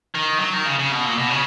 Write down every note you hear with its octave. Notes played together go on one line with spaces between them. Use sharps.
D#3
F#3
D#3
C#3
C#3
B2
A#2
B2
C#3